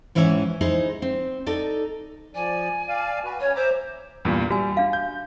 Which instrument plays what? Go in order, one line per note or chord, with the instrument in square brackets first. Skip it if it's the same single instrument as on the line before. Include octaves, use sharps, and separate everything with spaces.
[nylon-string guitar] G#2 E3 C#4 E5 G5 G#5
D#4 E4 G#4 C5
C4
D#4 A4 D5
[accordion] F3 D5 [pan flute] G#5
[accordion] D5 F5
F#4 B4
[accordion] C#4 [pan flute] C#5
[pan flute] C5 [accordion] E5 A#5 D6
[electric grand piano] E2 G2 A#2
[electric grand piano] G3 [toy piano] F#4 G#5
[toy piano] D4 F5
[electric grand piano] G6